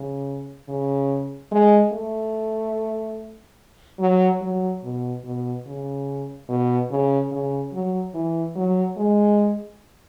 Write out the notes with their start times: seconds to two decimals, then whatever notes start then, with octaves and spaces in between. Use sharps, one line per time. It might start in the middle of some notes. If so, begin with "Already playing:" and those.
Already playing: C#3
0.68 C#3
1.52 G#3
1.92 A3
3.99 F#3
4.41 F#3
4.83 B2
5.24 B2
5.66 C#3
6.49 B2
6.91 C#3
7.32 C#3
7.73 F#3
8.14 E3
8.56 F#3
8.97 G#3